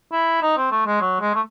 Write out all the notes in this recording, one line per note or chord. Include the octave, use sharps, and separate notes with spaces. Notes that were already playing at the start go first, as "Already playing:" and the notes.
E4
D#4
C4
A3
G#3
F#3
G#3
A3